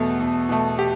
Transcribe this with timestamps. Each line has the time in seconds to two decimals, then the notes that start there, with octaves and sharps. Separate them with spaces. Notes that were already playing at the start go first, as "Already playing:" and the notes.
Already playing: E2 B2 A3 A4
0.19 E2
0.49 B2 A3
0.79 G4